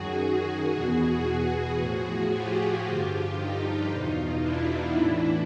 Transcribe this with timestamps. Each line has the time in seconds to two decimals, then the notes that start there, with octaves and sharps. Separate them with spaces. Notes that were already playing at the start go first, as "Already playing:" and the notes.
Already playing: F#2 D#3 F#4 G#4
0.72 E2 B2
1.77 A2 F3 F#4 G#4
2.29 F4 G4
2.83 G2 D3 F3 F4 G4
3.35 D#4 F4
3.89 E2 B2
4.41 D4 E4
4.94 A2 E3